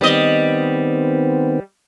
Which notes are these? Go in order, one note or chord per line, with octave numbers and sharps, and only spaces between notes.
D#3 G3 B3 C4 D#5